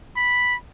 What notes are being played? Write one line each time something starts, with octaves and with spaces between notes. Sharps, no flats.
B5